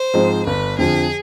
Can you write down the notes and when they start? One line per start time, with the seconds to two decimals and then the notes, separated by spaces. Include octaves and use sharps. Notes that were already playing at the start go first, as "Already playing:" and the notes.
Already playing: C5
0.14 G#2 F3 G#3 C4
0.46 G1 B4
0.78 F2 D3 F3 G#4